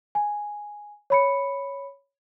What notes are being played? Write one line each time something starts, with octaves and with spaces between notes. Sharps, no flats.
G#5
C#5 B5 C#7